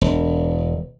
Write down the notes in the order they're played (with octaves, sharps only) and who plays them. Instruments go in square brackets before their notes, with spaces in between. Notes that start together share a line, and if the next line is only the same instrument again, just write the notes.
[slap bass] E1